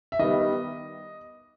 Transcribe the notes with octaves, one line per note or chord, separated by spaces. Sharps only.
E5
D#3 G3 B3 D#5